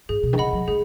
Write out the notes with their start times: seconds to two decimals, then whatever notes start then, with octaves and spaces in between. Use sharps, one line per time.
0.09 G#2 G#4
0.23 B2
0.33 D#3
0.38 C#3 D#5 F#5 B5
0.53 F#3
0.68 G#3 G#4